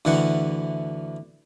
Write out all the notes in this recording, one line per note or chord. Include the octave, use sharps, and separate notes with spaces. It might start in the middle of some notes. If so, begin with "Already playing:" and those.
D2 D3 E3 F#5